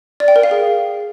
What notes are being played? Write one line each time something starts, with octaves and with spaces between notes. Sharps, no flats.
D5
G5
A#4
F5
G#4